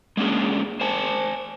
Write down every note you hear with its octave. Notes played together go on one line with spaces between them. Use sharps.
G#3 A#3 C#4 D4 G#4
C5 G#5 A5